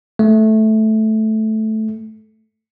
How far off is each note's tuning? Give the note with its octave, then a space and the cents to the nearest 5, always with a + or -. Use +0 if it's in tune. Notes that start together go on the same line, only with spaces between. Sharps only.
A3 -10